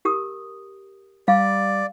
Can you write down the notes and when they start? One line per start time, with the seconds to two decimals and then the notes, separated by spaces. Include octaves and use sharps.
0.05 G4 A#4 D#6
1.28 G3 D5 F5